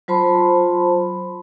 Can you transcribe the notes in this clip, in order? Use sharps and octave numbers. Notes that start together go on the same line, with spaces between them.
F#3 F4 C5 A5 B5 C6